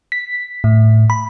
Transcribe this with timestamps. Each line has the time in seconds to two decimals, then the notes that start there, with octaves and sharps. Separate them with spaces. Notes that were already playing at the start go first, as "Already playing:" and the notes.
0.12 B6
0.64 A2
1.10 B5